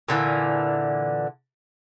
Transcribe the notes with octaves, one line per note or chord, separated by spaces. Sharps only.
A#2 D3 E3